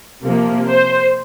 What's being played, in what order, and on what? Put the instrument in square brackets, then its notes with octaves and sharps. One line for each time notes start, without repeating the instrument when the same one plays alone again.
[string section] C3 F3 A#3
C5